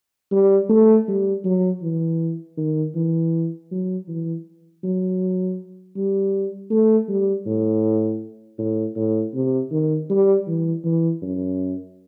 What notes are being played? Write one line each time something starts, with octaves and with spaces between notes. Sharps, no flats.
G3
A3
G3
F#3
E3
D#3
E3
F#3
E3
F#3
G3
A3
G3
A2
A2
A2
C3
D#3
G3
E3
E3
F#2